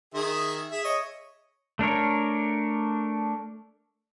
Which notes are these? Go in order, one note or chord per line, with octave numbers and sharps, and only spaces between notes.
D#3 G#4 E5
G#4 E5
C#5 D#5
A3 D4 A#4 C#5